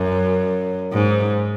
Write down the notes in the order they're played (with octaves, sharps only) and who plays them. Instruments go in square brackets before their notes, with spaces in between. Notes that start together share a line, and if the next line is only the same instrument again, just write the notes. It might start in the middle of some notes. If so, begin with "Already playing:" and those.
Already playing: [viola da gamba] F#2
G#2